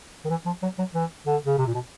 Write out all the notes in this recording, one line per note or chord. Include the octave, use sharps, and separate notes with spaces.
D#3
E3
F3
F#3
F#3
E3
D3
C#3
C3
A#2
B2